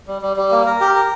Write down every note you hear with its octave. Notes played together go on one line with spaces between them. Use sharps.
G3
G3
G3
A#3
A#4
G4
A#4